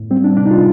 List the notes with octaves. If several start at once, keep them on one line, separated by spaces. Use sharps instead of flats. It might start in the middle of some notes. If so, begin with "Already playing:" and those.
Already playing: A2
G3 C4
D4
C3 D4
D#4
F4